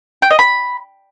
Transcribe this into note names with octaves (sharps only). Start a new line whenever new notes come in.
G5
D#5
B5